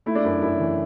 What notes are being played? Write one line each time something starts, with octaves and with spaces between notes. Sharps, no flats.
A3 E4
D4
F#2 E4
F#2 E4
E3